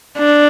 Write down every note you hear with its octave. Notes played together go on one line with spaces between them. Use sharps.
D4